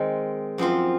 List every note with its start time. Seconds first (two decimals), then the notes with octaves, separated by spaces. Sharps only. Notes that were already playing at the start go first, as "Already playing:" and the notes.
Already playing: D#3 G#3 C4 D#4
0.58 F#2 F3 C4 F4